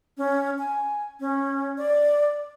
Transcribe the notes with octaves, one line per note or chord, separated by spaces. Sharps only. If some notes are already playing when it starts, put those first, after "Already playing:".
C#4
G#5
C#4
D5